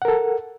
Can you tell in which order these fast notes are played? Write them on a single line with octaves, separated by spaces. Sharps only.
F#5 A#4 A4